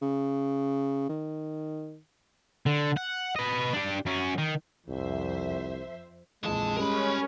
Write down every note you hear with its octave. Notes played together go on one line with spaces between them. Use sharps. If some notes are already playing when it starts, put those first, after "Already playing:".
C#3
D#3
D3
F#5
B4 D#5
D4 G4
F#2 C#4
D#3
C2 F2 C5 E5
A#1 F2 D3 E3 G#3 A5
G3 C#4 A#4 B5